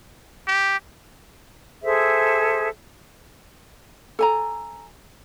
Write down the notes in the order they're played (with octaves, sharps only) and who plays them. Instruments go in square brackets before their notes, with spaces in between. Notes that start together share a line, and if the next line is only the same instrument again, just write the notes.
[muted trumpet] G4
[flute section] G#4 A4 C5 E5
[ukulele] A4 G#5 A#5